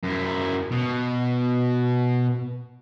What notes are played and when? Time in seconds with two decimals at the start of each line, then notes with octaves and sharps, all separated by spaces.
0.04 F#2 E4
0.71 B2